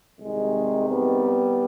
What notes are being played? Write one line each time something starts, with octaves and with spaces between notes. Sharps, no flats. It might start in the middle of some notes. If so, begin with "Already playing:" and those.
C2 C3 D#3 G#3
G3 B3